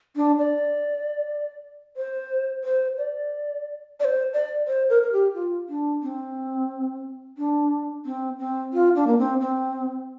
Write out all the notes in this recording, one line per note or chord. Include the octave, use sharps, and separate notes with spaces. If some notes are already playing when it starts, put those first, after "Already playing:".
D4
D5
C5
C5
D5
D5
C5
D5
C5
A#4
A#4
G4
F4
D4
C4
D4
C4
C4
F4
D4
A#3
C4
C4